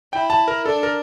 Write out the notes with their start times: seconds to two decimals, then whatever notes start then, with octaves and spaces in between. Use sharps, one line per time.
0.12 E4 G5
0.30 A5
0.48 A#4
0.65 D4 A4
0.83 A#4